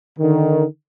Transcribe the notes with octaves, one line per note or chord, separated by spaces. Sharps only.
D3 D#3